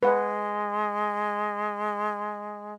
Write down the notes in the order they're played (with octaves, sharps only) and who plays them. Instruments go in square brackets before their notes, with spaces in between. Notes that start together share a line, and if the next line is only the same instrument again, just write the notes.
[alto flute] G#3 [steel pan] B4 F#5